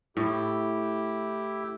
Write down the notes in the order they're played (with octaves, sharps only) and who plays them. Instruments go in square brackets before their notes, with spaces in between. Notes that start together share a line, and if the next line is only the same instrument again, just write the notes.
[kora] A2 [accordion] E4 G4